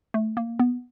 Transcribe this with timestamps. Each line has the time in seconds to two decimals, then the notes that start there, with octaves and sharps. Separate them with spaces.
0.14 A3
0.37 A#3
0.60 B3